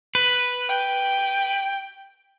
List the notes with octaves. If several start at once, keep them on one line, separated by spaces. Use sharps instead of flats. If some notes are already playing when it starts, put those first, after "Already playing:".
B4
G5